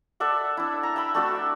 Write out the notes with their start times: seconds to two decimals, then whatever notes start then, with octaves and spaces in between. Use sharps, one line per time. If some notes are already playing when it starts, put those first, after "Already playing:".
0.20 A4 D5 E5 F#5
0.57 D4 E4
0.83 A#5
0.96 E5 G5 B5
1.15 A3 D4 F#4 E5